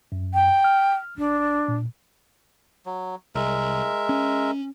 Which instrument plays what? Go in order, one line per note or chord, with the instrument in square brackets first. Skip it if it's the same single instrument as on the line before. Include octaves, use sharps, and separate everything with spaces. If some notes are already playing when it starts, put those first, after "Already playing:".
[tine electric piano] F#2
[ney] G5
[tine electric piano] F6
[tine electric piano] G1 [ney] D4
[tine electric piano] A#2
[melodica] F#3
[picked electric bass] C2 [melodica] G#3 A#4 E5
[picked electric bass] C#4